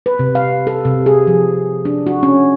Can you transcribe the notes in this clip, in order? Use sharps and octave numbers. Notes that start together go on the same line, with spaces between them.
B4
C3
F5
A4
C3
G#4
F3
D4
F#4
C#4